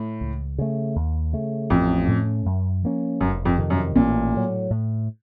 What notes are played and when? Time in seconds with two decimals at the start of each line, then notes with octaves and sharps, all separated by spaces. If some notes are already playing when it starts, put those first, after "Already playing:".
Already playing: A2
0.21 C#2
0.58 C#3 A3
0.96 D#2
1.33 C#3 A3
1.70 A1 F2
2.08 A2 A3 C#4
2.46 F#2
2.83 F3 A#3 C#4
3.20 F1 F#2
3.45 F2
3.58 F2 C3 D#3
3.70 F#2
3.95 A1 A#2
4.33 A2 F#3
4.70 A2